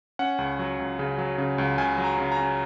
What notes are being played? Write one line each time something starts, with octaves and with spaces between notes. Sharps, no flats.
C#4 F#5
C#2
F#3
C#2
C#3
F#3
C#3
C#2
C#2 G#5
F#3
A#5
C#3
A#5
C#4